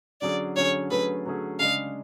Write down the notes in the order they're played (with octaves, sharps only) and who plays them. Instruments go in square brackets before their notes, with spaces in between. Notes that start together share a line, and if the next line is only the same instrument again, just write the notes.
[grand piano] D3 F#3 C#4 G#4 [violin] D5
[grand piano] D3 F#3 C#4 G#4 [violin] C#5
[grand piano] D3 F#3 A3 C#4 G#4 [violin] B4
[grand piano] D3 F#3 A3 C#4 G#4
[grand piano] C#3 G#3 D4 [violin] F5